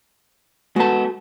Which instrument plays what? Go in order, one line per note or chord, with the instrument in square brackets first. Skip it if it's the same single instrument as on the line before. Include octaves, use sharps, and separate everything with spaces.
[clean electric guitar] G#3 A5 [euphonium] B3 [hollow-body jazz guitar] F#4 A4